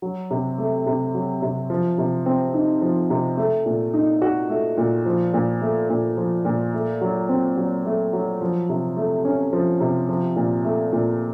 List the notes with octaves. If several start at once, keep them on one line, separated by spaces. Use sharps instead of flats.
F#3
C3
A3
C3
F#3
C3
F3
C3
C4
D#4
F3
C3
A3
A#2
D#4
F#4
A3
A#2
F3
A#2
A3
A#2
F3
A#2
A3
F#3
C4
F#3
A3
F#3
F3
C3
A3
C#4
F3
C3
F3
A#2
A3
A#2